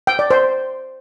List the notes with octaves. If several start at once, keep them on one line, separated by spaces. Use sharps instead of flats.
G5
D5
C5